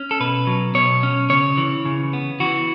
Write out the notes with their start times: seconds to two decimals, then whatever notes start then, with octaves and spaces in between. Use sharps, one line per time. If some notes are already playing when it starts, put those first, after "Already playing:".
Already playing: C#4
0.11 A4
0.20 B2 B4
0.47 F#3
0.75 B2 C#5
1.03 C#4
1.30 C#3 C#5
1.57 E3
1.85 C#3
2.13 B3
2.40 E3 F#4